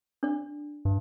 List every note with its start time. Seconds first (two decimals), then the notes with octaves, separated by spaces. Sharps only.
0.23 D4 D5
0.85 G2